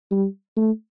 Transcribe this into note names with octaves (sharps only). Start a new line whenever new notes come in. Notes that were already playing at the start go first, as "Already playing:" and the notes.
G3
A3